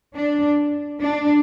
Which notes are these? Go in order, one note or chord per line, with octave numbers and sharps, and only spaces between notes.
D4
D4